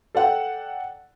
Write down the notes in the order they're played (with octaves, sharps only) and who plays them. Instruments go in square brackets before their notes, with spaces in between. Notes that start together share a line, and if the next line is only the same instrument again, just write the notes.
[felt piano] A4 D5 F#5 G5